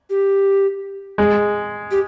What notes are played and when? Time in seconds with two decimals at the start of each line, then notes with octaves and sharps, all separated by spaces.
0.10 G4
1.18 G#3
1.91 G4